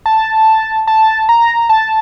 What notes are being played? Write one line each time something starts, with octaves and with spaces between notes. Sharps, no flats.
A5
A5
A#5
A5